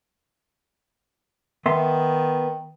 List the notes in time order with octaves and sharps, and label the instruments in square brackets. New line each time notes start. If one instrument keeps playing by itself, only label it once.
[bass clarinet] D#3 [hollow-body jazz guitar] B3 E5 C6